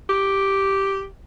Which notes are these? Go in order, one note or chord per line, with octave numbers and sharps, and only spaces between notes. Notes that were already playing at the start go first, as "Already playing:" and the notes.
G4